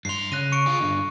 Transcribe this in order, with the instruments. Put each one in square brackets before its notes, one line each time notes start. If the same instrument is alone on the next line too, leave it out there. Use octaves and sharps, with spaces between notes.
[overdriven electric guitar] G2 C6 [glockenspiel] C7 F7
[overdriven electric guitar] C#3 [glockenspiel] F#6 A#6 D#7
[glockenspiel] C#6 C#7 D7
[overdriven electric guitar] F4 G#4
G2 D3